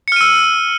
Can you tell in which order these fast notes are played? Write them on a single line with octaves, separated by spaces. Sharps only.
C#7 F6 D#7 E6